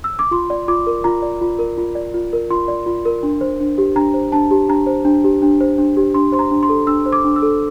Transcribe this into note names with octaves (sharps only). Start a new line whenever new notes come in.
E6
D6
F4 C6
D5
F4 D6
A#4
F4 A#5
D5
F4
A#4
F4
D5
F4
A#4
F4 C6
D5
F4
A#4
D4
C5
D4
G4
D4 A#5
C5
D4 A5
G4
D4 A#5
C5
D4
G4
D4
C5
D4
G4
D4 C6
C5 C6
A#5
D4
C6
A4
D4 E6
C5
D6
D4
E6
A4